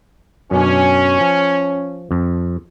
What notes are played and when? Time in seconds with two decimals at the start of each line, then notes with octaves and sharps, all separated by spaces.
0.51 F#2 B2 C#4 D4
1.21 F3
2.11 F2